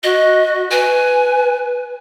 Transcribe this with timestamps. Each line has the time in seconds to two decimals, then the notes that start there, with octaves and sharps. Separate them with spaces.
0.03 F#4 D#5
0.71 B4 G#5